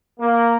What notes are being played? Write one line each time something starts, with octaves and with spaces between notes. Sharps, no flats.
A#3